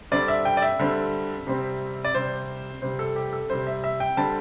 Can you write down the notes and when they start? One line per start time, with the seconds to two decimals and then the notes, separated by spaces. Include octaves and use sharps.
0.12 D3 G3 C4 D5
0.28 E5
0.45 G5
0.57 D5
0.62 E5
0.80 D3 G3 C4
1.47 C3 G3 C4
2.05 D5
2.15 C3 G3 C4 C5
2.82 C3 G3 C4 C5
2.99 A4
3.16 G4
3.33 A4
3.50 C3 G3 C4 C5
3.67 E5
3.84 E5
4.00 G5
4.17 D3 G3 C4 A5